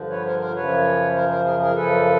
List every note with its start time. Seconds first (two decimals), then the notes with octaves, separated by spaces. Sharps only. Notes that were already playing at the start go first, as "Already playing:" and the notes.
Already playing: G2 D3 F3
0.09 B4 C#5
0.23 A#4 C5
0.39 A#4 C5
0.54 F#2 C#3 F3 B4 C#5
1.14 A#4 C5
1.29 A#4 C5
1.44 G#4 A#4
1.58 G#4 A#4
1.73 F#2 C#3 F3 A4 B4